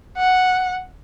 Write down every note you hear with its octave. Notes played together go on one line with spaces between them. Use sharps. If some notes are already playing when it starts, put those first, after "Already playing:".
F#5